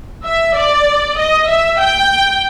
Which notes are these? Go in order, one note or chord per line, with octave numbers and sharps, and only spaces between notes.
E5
D5
D#5
E5
G5